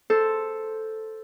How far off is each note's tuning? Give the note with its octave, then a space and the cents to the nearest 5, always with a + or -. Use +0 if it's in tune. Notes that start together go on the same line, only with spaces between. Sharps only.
A4 +0 C5 +0